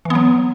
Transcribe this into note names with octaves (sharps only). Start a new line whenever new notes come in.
E3 F#3 B3